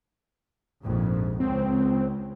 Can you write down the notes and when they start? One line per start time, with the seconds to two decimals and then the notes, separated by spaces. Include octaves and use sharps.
0.82 A#1 F2 G#2
1.40 C#2 C4